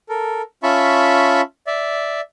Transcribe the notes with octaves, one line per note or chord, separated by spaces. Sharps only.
A4 A#4
C#4 F4 E5 A5 B5 C#6
D5 E5